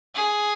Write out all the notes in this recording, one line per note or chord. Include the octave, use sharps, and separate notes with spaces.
G#4